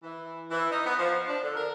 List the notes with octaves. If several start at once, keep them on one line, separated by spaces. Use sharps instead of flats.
E3
E3
D#4
B3
F3
D4
D3
A#4